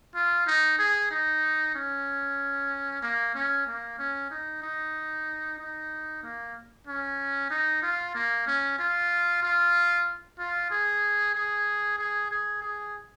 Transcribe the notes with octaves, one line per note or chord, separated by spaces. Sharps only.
F4
D#4
G#4
D#4
C#4
A#3
C#4
A#3
C#4
D#4
D#4
D#4
A#3
C#4
D#4
F4
A#3
C#4
F4
F4
F4
G#4
G#4
G#4
G#4
G#4